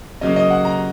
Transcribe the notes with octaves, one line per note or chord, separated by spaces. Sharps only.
C#3 F#3 A#3 D#5
D#5
F#5
A#5